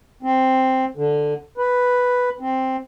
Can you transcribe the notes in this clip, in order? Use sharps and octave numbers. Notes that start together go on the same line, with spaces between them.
C4
D3
B4
C4